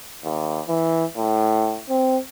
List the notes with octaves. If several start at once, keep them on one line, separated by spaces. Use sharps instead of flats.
D#2
E3
A2
C4